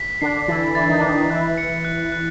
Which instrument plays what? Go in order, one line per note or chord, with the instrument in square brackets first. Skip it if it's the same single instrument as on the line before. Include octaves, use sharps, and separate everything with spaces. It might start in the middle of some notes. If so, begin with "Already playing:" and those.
Already playing: [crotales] B6
[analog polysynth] D3 D4 [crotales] C7
[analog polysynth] E3 E4 [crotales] A6
[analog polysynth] E3 E4 [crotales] A6
[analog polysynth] D#3 D#4
D4
[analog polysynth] D#3 D#4 [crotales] A6
[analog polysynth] D#3 D#4
[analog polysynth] E3 E4 [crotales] F#6
[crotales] C#7
F#6
F#6